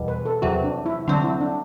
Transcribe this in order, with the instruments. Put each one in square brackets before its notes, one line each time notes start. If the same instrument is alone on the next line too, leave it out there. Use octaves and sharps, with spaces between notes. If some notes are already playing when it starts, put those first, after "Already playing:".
Already playing: [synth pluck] E2 B2 G3
[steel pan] B4
A4
[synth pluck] E2 C3 F#3 [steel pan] F#4
[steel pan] D4
E4
[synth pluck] D3 F#3 C4 [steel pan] D4
[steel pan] E4
D4